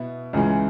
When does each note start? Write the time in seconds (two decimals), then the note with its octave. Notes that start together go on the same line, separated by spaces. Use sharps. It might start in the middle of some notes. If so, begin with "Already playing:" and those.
Already playing: B2 B3 E4
0.33 C#2 C#3 E3 G#3